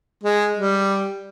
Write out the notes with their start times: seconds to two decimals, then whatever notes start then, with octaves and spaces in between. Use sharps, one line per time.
0.24 G#3
0.57 G3